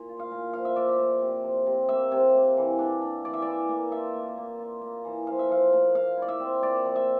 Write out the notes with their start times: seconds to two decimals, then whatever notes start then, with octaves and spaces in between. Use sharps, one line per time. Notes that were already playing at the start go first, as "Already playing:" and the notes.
Already playing: A#2
0.09 F4
0.19 F5
0.31 A#2
0.53 F3 F5
0.65 E5
0.76 F3 D5
0.89 E5
0.98 A#2
1.21 C3
1.44 F3
1.66 C3
1.89 A#3 E5
2.12 C3
2.35 A#3
2.57 E3
2.79 D4
3.01 D4
3.24 E3 D5
3.33 E5
3.42 E3 D5
3.69 A#3
3.92 F4 E5
4.14 A#3
4.37 A#3
4.59 F4
4.81 A#3
5.05 E3
5.27 F3 F5
5.39 E5
5.49 F3 F5
5.73 A#2
5.94 A#2 F5
6.17 E4 D5
6.28 E5
6.40 C4
6.62 A#2 D5
6.85 F3
6.96 E5